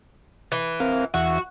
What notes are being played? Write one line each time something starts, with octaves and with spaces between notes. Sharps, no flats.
E3
C4 A#4 F5
E2 F#4 E5